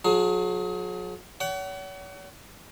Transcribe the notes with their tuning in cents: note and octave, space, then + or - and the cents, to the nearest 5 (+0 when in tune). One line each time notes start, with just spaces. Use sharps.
F#3 -35 G#4 +30
C#5 +40 F#5 +35